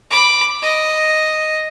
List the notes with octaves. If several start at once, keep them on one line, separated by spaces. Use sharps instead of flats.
B5 D6
D#5